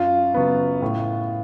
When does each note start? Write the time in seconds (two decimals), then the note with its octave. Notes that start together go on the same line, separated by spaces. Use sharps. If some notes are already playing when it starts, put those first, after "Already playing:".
Already playing: F#2 F4
0.34 C#3 F#3 B3
0.82 A2